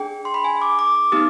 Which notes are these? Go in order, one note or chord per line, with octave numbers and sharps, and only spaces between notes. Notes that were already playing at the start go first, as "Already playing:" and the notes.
Already playing: D4 G#4 G5
C6
B5
G#5
D6
D6
D6
B3 D#4 G4 D#6